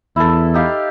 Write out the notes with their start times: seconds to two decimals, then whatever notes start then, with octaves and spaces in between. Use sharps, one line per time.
0.16 E2 E4 A4
0.54 D#4 G4 F5